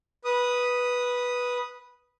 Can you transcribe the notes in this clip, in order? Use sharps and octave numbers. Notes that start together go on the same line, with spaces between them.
B4 D#6